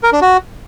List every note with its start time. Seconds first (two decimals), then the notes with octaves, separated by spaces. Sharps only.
0.03 A#4
0.12 D4
0.22 F#4